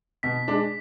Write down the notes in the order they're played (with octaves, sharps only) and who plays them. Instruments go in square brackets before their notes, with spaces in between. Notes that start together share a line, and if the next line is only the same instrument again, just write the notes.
[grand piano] B2 [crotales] B6
[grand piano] G#3 D4